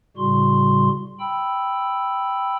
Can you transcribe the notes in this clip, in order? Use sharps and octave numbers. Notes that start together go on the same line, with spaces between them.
A2 C#3 G3 F#4 C6
G5 B5 E6